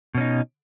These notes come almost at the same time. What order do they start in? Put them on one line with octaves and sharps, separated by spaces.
B2 C#4 D#4